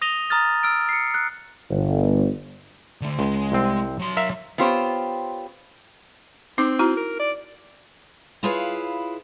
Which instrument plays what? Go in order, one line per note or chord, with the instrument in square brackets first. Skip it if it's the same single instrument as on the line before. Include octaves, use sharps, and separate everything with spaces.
[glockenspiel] D#6 A#6 D#7 F7 G7
A#5 D#6 F6 A6
E6 F6 D7
C7 C#7
F#6
[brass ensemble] G1
[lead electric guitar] D3 A3
[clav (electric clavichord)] C#2 [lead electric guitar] G#3 C6
[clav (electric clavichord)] C2 C4
[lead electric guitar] F#3 C6
[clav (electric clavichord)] A#4 E5 F5
[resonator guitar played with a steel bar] B3 C4 F4 G4 C5 C#5
[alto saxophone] C4 [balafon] D#4 D6
[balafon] E4 F#4 A#5
[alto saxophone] A#4
D5
[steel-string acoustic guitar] E4 F4 G#4 B4 C#5 F5